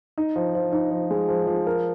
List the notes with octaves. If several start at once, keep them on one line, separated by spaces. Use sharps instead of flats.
D#4
F3
F3
D#4
F3
G#3
F3
F3
A#4